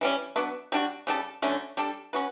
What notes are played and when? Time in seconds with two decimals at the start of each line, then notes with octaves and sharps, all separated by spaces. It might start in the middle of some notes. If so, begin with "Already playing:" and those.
0.01 E3 G3 C#4
0.36 F#3 B3 D4
0.72 G3 D4 F#4
1.07 C#3 G3 D4 A4
1.42 D3 F#3 A3 C#4
1.77 G3 D4 A4
2.13 C#4 F#4 B4